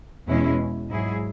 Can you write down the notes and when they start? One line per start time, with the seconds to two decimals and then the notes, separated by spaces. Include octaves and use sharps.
0.27 E2 B2 G#3 C#4 E4
0.89 G#2 F#3 E4 G#4